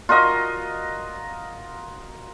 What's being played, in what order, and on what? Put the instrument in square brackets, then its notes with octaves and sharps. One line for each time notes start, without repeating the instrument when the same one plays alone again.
[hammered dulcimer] F4 F#4 A#4 D#5